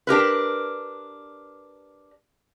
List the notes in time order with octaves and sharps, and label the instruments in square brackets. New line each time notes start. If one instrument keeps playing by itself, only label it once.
[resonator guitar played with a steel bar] D4 G4 A#4 B4